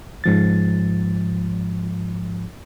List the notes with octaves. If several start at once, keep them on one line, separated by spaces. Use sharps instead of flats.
G#2 F3 A6